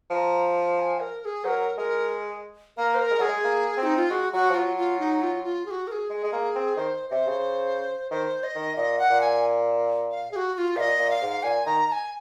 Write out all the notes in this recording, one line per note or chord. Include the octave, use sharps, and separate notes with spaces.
F3 A#5 C6
A#5
G#5
A#4
A#4
G#4
F#3 A#4 C5
G#3 A#4
A#3 A#4
C5
A#4
G#3
F#3 G#4
G#3
A#3
C4
D#4
F4
G#3 F#4
F#3 F#4
F3
F#3 F4
F4
D#4
F4
F4
G#4
F#4
A#4
G#4
G#3
G#3
A#3
C4
D#3 C5
C3 C5 D#5
C#3
D#3 C5
D#5
D#3
A#2 D#5
F#5
A#2
G#5
F5
G#4
F#4
F#4
F4
A#2 D#5 F5
A#2
F5
G#2
A#2 G#5
D#3 A#5
A#5
G#5